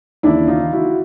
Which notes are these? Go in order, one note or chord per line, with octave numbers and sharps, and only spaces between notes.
D#2 C#3 E3 D4 E4
D#4 F4
E4 F#4